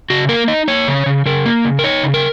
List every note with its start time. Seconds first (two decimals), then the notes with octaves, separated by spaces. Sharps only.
0.10 C#3 F#4
0.29 A#3 A#4
0.48 D#4 D#5
0.68 A#3 C#5
0.88 C#3
1.06 C#3
1.26 C#3 A#4
1.46 A#3
1.65 C#3
1.79 A#4
1.84 D#4 C#5
2.03 C#3
2.14 A#4